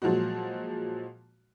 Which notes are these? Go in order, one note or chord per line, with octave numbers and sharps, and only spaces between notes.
A#2 F3 F#3 G#3 F#4